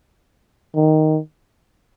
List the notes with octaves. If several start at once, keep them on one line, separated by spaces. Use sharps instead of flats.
D#3